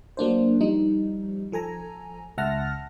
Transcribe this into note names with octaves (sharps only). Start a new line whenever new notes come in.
F#3 A#3 D4 C5
F3 G3 D#4
F3 A4 G#5 A#5
C#2 E5 F#5 A5 F6 A#6